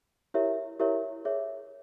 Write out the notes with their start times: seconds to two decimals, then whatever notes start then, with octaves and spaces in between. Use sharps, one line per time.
0.34 E4 G4 A#4 C#5 E5
0.80 E4 G4 A#4 C#5 E5
1.25 G#4 C#5 E5